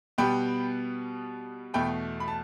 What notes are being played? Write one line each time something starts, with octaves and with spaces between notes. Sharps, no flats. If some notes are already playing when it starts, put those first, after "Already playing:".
B2 G3 B3 G5 B5
E2 B2 A3 G5 B5
B5
A5